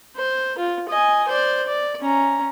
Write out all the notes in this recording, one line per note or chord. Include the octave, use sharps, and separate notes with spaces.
C5
F4
D#5 G#5
C5 D5
D5
C#4 A#5